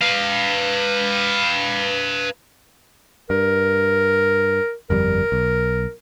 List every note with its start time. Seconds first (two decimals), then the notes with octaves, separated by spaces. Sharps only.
0.02 B4 F5
3.30 G2 A#4
4.90 G1 F2 G3 A#4
5.32 B1